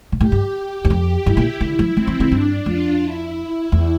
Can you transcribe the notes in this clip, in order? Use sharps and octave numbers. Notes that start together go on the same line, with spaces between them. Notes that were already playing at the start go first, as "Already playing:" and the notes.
A#2
A2 G4
G2
G4
E2
F2 G4
G2 E4
A#2
D3
F3
E3 C4
E3
D3
G2 D4
F2 F4
E4
E2